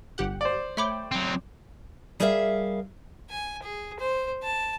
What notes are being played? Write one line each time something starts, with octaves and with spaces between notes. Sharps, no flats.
G1 G4 F#5
C5 D5
A3 C#5 E5 G5 B5 D6
F#3 C4
G3 G#4 A#4 B4 E5 F5
G#5
G#4
C5
A5